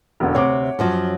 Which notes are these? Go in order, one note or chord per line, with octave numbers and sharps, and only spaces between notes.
E1 E2 D3
D2 C3 C#5 F#5 D6
F#2 F3 F#3